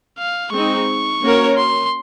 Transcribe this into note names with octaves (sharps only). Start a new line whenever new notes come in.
F5
G#3 C4 D#4 C#6
A#3 C#4 F#4 A#4 C#5
C6